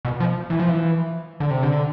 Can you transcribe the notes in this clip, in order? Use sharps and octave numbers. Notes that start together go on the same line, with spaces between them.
B2
F3
E3
F3
E3
D3
C3
D3